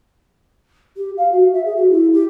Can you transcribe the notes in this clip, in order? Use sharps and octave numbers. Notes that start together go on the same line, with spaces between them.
G4
F5
F#4
E5
G#4
F#4
E4
G4